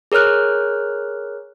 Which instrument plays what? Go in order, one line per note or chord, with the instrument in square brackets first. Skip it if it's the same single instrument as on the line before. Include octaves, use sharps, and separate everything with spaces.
[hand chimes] G#4 A#4 C#5 F6 F#6